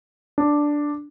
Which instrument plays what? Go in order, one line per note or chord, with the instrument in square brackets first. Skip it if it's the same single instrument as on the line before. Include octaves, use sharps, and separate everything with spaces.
[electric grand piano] D4